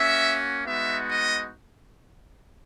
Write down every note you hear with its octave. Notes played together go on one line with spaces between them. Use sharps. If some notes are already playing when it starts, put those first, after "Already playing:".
Already playing: A#3 C#4 F#4 E5
G#3 B3 D#4 F#4 E5
D#5